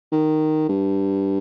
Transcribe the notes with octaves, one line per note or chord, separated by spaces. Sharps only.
D#3
G2